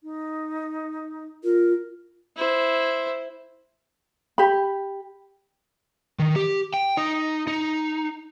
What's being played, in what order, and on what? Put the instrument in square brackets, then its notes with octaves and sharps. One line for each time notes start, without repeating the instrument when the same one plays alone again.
[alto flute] D#4
[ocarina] F4 [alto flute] A#4
[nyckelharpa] E4 C5
[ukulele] G4 B5
[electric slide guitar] D#3
G4
G5
D#4
D#4